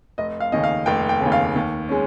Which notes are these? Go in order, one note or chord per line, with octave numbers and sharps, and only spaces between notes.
F1 D#5
F5
D#2 C#3 D#5
F5
F1 G5
G5
C#3
D#2
F5
D#2
G#3 C#4